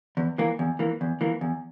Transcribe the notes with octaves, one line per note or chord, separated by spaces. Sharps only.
E2
E3 A#3
E2
E3 A#3
E2
E3 A#3
E2